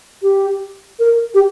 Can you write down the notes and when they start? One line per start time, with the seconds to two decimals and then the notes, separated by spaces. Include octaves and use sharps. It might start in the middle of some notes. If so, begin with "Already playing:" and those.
0.22 G4
0.99 A#4
1.34 G4